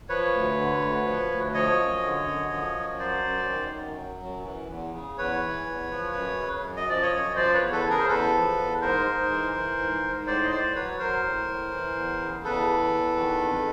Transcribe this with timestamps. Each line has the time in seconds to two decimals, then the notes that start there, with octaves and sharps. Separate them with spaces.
0.09 F3 B4 C#5
0.34 D2
0.57 D3
0.81 D2
1.06 F3
1.31 D2
1.54 F3 C#5 D#5
1.79 F#2
2.03 D3
2.27 F#2
2.51 F3
2.76 F#2
2.99 F#3 C5 D5
3.24 F#2
3.49 D#3
3.73 F#2
3.97 F#3
4.22 F#2
4.45 E3
4.69 E2
4.94 C#3
5.17 E2 B4 C#5
5.42 E3
5.66 E2
5.91 F3
6.15 F#2
6.40 C#3
6.63 F#2
6.77 D#5
6.88 F3 D5
7.02 C#5 D#5
7.12 F#2
7.35 F3 C5 D5
7.54 B4 C#5
7.59 E2
7.72 A4 B4
7.84 C#3
7.90 G#4 A#4
8.00 C5
8.08 E2 A4 B4
8.33 F3
8.57 E2
8.81 G#2 A#4 C5
9.06 G#2
9.29 E3
9.54 E3
9.78 G#2
10.03 G#2
10.26 A2 C5 D5
10.43 D#5
10.50 A2 C5 D5
10.75 F#3 B4 C#5
10.99 F#3 A#4 C5
11.24 A2
11.48 A2
11.71 E3
11.96 E2
12.21 C#3
12.44 E2 A4 B4
12.68 E3
12.93 E2
13.17 D#3
13.42 F2